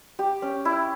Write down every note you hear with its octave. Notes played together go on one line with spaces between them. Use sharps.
G4
C#4
E4